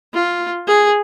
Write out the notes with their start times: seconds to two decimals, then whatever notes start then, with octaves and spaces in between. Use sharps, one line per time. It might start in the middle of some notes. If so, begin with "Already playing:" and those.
0.14 F4
0.67 G#4